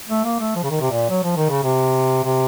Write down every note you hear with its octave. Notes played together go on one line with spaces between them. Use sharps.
A3
A#3
A3
F3
C#3
D#3
C3
A#2
F#3
F3
D#3
C#3
C3
C3